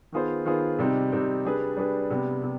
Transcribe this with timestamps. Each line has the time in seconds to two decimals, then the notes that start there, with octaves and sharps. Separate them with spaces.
0.12 D#3 B3 F4 G#4 C5
0.45 D#3 B3 F4 G#4 C5
0.79 C3 G3 C4 D#4
1.12 C3 G3 C4 D#4
1.45 G3 D4 G#4 B4
1.76 G3 D4 G#4 B4
2.10 C3 G3 B3
2.43 C3